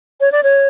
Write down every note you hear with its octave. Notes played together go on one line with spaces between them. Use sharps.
C#5
D5
C#5